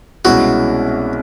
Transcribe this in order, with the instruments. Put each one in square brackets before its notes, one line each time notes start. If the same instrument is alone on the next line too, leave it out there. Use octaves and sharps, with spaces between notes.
[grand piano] C2 B2 G#3 C#4 E4 [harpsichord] F#4